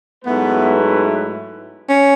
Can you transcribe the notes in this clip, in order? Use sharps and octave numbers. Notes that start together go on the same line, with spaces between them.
G#2 F#3 A3 B3 E4 B4
C#4